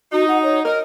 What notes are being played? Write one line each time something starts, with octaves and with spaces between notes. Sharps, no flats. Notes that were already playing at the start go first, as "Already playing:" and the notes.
D#4 F#4
F#5
C#5
A#4 D#5